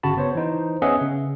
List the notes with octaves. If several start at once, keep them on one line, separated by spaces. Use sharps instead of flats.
G1 C#3 F#4 A5 B5
B3 C5 C#5
E3 D#4 C5
B3 C#4 G#4 D#5 E5 F#5
C#3